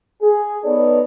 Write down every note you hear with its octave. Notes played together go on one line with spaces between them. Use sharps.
G#4
B3 D#4 A4 B4 C#5 D5